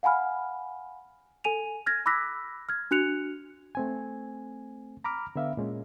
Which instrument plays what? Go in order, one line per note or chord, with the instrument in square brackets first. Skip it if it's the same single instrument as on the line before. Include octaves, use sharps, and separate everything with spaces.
[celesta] F5 F#5 G#5 B5 F6
A4 G#5 D#7 F7
F6 G#6 A#6
B5 D6 E6 F#6 A#6 B6
F6 G#6
D4 F#4 F#6 C#7 F7
[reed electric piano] A3 C4 G#5
A#5 B5 D6 F6
D3 B3 E5 F5
A#2 G#3 C#4